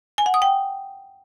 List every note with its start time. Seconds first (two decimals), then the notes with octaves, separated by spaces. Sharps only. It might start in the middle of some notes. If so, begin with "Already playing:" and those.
0.18 G#5
0.26 F#5
0.34 D#6
0.42 G5